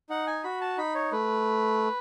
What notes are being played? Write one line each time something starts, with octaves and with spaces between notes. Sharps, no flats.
D#4 F#5
G#5
F#4 B5
A5
D#4 B5
C#5
A3 B4